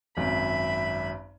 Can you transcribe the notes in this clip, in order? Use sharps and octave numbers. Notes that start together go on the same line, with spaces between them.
G#1 F#2 E5 B5